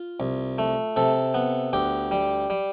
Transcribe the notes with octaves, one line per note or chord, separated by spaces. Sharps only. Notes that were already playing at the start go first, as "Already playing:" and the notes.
Already playing: F4
C2
A3
C3 A4
B3
D2 G4
G3
G3